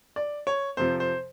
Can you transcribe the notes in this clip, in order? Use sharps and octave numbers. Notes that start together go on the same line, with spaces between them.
D5
C#5
F2 C3 F3 C5
C5